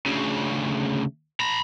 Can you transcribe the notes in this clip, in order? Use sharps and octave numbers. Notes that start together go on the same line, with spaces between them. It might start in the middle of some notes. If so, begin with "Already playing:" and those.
D2 C#3
A#5 B5